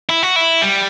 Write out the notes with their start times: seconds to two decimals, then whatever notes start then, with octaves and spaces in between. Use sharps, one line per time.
0.09 E4
0.23 F#4
0.36 E4
0.62 G3